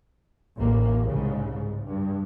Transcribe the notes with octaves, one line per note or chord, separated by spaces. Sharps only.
A1 D#2 A#3
C2 G#2 C#3
G#2
G2